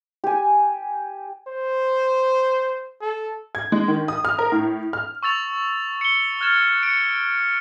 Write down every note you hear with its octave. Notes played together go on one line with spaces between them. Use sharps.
G4 G#5
C5
A4
G#6
G#3
D#3
D#6
F6
A#4
A2
F6
C#6 E6 A6 F7
C#7 G7
F6 F#6 G#6 A6 E7
C#7 D7